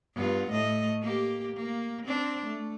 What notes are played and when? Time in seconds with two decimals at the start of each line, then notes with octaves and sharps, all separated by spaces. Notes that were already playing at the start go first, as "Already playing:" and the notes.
0.15 G2 B3 F4
0.50 A2 A3 D#5
1.02 A#3 G4
1.56 A#3
2.06 C4 D4
2.46 A3